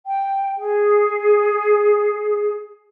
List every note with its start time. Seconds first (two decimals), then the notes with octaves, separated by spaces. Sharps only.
0.07 G5
0.58 G#4